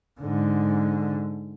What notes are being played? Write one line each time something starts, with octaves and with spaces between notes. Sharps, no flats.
G#2 D3